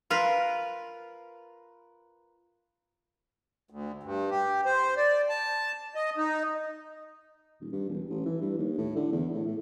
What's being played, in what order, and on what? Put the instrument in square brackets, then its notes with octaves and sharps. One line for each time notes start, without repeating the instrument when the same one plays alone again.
[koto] F4 A#4 B4
[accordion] D2
G2
G4
C5
D5
A5
D#5
D#4
[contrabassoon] D#1
G2
E1
A1
E3
G2
D#2
A2
D3
E2
A2
A2